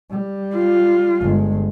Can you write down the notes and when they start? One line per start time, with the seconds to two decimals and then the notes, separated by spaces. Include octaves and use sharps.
0.11 G3
0.55 F4
1.21 G1 G#3